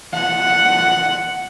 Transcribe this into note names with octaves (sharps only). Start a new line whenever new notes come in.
F#5